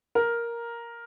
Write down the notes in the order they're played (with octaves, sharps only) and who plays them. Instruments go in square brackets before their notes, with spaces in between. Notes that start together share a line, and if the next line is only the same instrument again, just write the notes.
[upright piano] A#4